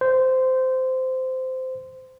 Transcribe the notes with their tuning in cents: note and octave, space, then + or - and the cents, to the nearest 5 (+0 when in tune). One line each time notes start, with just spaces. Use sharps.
C5 -15